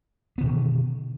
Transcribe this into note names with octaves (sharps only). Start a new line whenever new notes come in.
B2 D3 D#3 B3